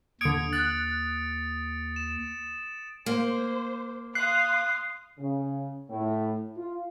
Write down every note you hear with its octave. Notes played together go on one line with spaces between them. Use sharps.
D#2 D3 D#6 G#6 C#7 D7
F#6 A6
E7
A#3 C5
F5 C6 D#6 F#6 C7
C#3
A2
F4